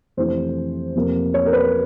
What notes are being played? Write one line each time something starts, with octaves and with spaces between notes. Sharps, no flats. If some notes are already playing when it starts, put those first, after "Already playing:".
F2 C3 E3 A3 C4 C5
F2 C3 F3 A#3
C#5
A#4
B4